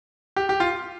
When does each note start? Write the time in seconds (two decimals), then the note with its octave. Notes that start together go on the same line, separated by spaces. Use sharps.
0.36 G4
0.49 G4
0.60 F4